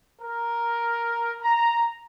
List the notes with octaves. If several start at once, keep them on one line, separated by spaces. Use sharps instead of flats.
A#4
A#5